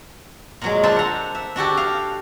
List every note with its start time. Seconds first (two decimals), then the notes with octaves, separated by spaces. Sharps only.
0.62 A#2 F#3 G#3
0.83 D4 F4 A4 C5
0.96 F#5 A#5
1.35 E5
1.56 D4 F#4 G4 A4
1.77 F5